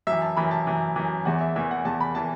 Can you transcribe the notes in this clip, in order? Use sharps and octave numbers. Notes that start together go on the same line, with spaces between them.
F#2 E3 E5
A5
F#2 E3 B5
A5
F#2 E3
F#2 E3
E2 E3 F#5
E5
E2 E3 E5
F#5
E2 E3 A5
B5
E3 A5